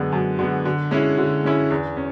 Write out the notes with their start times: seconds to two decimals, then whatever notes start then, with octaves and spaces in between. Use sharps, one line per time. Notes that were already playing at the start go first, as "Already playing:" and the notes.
Already playing: F#2 D3 G#3 B3
0.12 F#2
0.39 D3 G#3 B3
0.65 D3
0.91 G#3 C#4 E4
1.18 D3
1.44 G#3 C#4 E4
1.71 E2
1.97 C#4